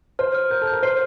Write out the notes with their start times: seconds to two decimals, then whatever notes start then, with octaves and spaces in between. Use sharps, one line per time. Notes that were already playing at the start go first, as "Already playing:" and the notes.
0.19 C5 F6
0.34 F6
0.51 A#4 G6
0.62 A4
0.67 A#4 G6
0.83 C5 C7